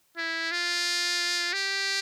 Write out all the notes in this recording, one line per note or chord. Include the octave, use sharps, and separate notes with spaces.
E4
F4
G4